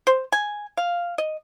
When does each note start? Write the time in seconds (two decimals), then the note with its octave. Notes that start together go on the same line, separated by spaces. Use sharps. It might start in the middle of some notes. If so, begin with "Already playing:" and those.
0.07 C5
0.32 G#5
0.77 F5
1.18 D#5